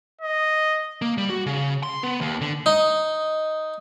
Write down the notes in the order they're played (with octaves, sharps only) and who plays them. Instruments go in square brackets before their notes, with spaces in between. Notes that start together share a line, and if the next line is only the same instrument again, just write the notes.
[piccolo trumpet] D#5
[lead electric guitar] A#3
G3
F#4
C#3
C6
B3
D#2
D3
[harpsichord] D#4